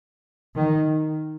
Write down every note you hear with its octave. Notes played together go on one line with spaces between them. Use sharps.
D#3